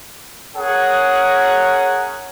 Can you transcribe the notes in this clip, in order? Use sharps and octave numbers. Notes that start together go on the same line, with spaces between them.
C#4 G#4 A#4 F#5